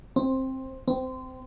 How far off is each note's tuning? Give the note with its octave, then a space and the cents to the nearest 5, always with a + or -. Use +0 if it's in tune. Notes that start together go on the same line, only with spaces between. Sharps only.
C4 +10
C4 -20